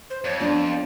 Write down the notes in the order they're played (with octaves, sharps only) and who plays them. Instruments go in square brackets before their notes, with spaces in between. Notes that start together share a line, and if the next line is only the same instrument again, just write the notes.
[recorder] C5
[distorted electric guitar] F2 [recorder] C#5
[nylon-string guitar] F3 B3 D4 [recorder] D5